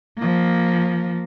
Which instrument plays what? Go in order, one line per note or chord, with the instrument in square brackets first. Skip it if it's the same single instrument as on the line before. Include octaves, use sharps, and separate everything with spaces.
[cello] F3 A#3